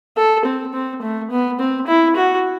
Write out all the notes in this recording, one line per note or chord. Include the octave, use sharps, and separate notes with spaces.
A4
C4
C4
A3
B3
C4
E4
F#4